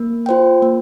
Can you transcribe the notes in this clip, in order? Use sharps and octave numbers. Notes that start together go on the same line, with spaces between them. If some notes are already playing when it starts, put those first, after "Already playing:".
Already playing: A#3
F4 C5 G5
A#3